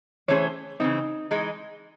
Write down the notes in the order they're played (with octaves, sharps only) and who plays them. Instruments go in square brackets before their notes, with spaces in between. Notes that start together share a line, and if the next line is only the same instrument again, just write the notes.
[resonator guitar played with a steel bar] E3 A3 C#4 G#4 C5 [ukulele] C#5
[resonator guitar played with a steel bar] C#3 E3 C4 [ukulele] D#4
[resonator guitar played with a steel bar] E3 G#3 D#4